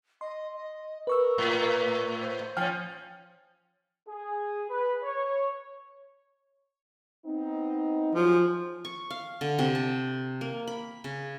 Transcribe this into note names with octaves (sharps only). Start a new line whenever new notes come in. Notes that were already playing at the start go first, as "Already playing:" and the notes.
D#5 C6
D#5
A#4 B4 C#6 E6
A2
C5
F3 C#4 G5 G#5 F6
G#4
B4
C#5
B3 C4 D#4
F3 F#3 G#4
C#6
F5
D3
C3
A5
A#3
B5
C#3